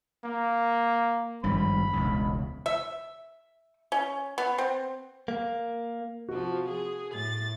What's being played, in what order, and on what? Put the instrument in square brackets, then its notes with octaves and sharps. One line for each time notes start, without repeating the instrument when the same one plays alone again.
[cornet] A#3
[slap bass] G#1 G2 F3 [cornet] B5
[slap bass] E1 C#2
[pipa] E5
C#4
B3
C4
[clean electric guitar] A#3
[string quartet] C3 F3 [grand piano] F#4
[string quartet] G#4
A2 A6